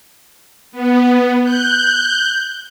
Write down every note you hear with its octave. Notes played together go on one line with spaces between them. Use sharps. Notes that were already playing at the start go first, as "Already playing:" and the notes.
B3
F#6 G6